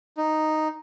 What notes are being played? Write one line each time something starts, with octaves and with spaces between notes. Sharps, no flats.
D#4